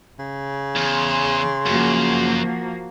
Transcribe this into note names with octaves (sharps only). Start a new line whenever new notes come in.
C#3
E2 C6
F#2 F3 A#3 F#4